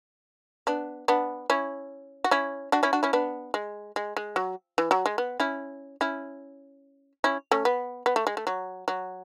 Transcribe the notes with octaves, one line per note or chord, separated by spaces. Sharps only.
B3 D4
B3 D4
C#4 E4
F#4
C#4 E4
D4 F#4
C#4 E4
D4 F#4
C#4 E4
B3 D4
G#3
G#3
G#3
F#3
E3
F#3
G#3
B3
C#4 E4
C#4 E4
C#4 E4
A3 C#4
B3
B3
A3
G#3
A3
F#3
F#3